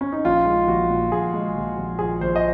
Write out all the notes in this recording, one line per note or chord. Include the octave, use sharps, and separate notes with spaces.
C#4
D#4
A#1 F4
G#3
A#1 F#4
A#2
A#1 G#4
G#3
A#1
A#1
A#1 G#4
A#1 C5
D#5